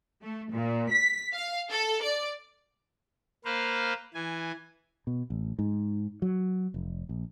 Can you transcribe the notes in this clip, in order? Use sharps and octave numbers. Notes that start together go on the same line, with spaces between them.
A3
A#2
B6
F5
A4
D5
A#3 B4 C5 F5
E3 G#5
B2
A1
G#2
F#3
F1
A#1